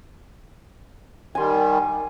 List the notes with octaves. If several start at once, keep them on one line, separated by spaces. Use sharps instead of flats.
D#3 G3 G#5 C6